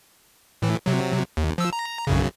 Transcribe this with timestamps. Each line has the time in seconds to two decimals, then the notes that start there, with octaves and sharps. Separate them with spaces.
0.62 A2 E3
0.86 C3 F#3
1.37 D#2
1.58 F3 E6
1.73 A#5
2.07 B1 F#2 C#3